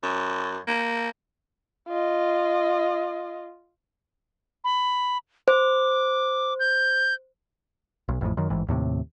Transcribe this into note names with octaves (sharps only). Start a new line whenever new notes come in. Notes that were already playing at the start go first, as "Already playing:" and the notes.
F#2
A#3
F4 D#5
B5
C5 D6
G6
B1
A1 F2 A2
F#2 D#3
A1 G#2 E3
D#2 A2 C3